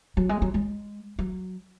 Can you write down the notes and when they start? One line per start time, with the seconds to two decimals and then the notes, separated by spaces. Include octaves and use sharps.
0.17 F#3
0.29 G#3
0.42 F#3
0.54 G#3
1.19 F#3